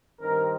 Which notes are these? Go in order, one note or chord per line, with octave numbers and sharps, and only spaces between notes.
G2 D#3 C4 A#4